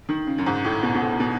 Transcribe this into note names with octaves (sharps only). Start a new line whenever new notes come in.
D#3
C#3
F#2
G#2
A2
B2
B2
A2
B2